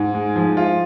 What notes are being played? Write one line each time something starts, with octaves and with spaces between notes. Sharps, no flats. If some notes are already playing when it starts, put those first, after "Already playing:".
Already playing: G#2
G#3
F3
F4